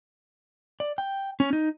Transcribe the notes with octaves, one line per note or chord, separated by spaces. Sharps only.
D5
G5
C#4
D#4